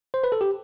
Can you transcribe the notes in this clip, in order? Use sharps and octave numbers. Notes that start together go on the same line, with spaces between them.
C5
B4
A4
G4